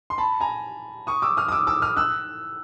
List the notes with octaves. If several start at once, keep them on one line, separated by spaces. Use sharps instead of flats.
C6
A5 B5
G#5 A#5
C#6 D#6
D6 E6
D#6 F6
D#6
D6 E6
D6 E6
D#6 F6
E6 F#6